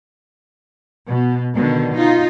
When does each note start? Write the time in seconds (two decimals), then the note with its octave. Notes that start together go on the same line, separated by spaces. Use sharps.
1.06 B2
1.55 B2 D3 D#3
1.97 D#4 F4